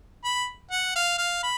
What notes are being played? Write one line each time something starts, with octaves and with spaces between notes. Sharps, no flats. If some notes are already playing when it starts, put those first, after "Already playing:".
B5
F#5
F5
F5
B5